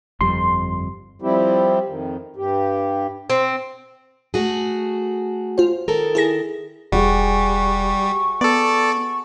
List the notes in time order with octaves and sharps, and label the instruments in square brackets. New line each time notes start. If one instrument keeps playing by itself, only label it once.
[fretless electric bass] G1 F2 G3 [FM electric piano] C6
[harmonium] F3 G3 C4 E4 G4
F2 D#3
G2 G4
[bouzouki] C4
[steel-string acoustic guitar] A3 F#4 G#4
[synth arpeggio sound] F4 C5
[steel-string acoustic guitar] D#3 A4 A#4
[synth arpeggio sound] E4 G#4 A#6
[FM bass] E1 [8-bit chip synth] G3 [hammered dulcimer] F#4 G#4 [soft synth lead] C#6
[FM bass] B3 [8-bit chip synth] A4 D5